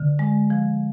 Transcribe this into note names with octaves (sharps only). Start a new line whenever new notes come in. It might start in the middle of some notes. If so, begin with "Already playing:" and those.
Already playing: D3
G#3
F3